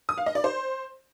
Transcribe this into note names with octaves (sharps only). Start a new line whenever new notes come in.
D#6
F5
D#5
D5
C5